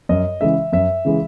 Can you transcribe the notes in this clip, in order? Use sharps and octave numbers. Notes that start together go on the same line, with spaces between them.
F#2 D#5
C#3 E3 G#3 E5
F#2 E5
C#3 E3 G#3